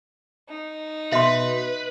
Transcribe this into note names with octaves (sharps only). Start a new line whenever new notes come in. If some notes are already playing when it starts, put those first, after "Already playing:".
D#4
B2 B4 E5 C6